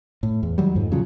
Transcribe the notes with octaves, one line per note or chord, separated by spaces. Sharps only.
A2
E2
D#3 F#3 G3
F2 G#2
A#2 C#3 F3 F#3